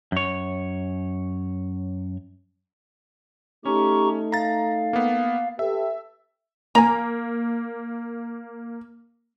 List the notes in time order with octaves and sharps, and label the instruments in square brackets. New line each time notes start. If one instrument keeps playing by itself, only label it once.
[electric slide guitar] F#2 C#5
[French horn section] A3 D#4 [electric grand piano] C#4 [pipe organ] G4 A#5 C#6
[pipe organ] F5 [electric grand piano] A#5 A6
[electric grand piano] A#3 B3
[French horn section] G4 A4 B4 [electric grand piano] E5
[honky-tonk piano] A#3 [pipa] G#5 A#5